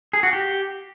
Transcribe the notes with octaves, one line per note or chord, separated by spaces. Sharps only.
G#4
F#4
G4